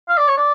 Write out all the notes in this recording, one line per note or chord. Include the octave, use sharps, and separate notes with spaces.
F5
D5
C#5
D5